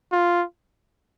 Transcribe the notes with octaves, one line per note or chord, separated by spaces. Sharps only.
F4